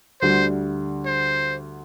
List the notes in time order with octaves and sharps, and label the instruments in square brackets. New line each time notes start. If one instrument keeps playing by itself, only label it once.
[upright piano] D2 D3 G3 [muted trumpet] C5
[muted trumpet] C5